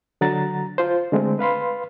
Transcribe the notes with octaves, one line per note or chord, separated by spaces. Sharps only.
D3 F#3 F#5 A#5 A6
F4 C5
D3 G#3 A3 C4
B4 F5 B5 C6